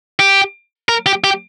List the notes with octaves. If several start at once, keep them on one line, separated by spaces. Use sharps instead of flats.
G4
A#4
G4
G4